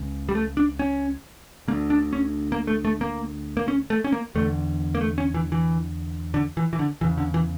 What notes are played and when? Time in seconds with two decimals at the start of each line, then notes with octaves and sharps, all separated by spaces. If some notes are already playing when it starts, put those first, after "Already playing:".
Already playing: C#2 C#3
0.29 G3
0.35 A3
0.57 D4
0.79 C#4
1.68 D3 A#3
1.72 D2
1.90 D4
2.13 C#4
2.52 A#3
2.67 A3
2.85 A3
3.01 A#3
3.57 A#3
3.68 C#4
3.90 A3
4.04 C#4
4.12 A#3
4.35 E2 D3 A3
4.95 A#3
5.01 A3
5.18 C#4
5.34 E3
5.52 E3
6.34 D3
6.57 E3
6.73 E3
6.79 D3
7.01 E2 C#3 E3
7.18 D3
7.34 E3